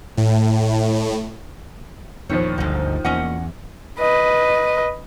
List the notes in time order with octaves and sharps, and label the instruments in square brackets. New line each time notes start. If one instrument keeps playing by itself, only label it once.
[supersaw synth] A2
[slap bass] E2 A#2 [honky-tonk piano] D#3 F3 [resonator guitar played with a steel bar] C#5
[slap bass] G1 D3 [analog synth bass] D2 [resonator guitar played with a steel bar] G#2 D#4
[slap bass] E2 [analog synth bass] A#2 [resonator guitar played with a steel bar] C#4 D#5 F#5
[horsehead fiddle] B4 D#5